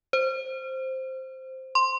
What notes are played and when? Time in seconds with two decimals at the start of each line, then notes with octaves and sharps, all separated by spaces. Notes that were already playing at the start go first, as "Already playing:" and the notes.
0.13 C5
1.75 C6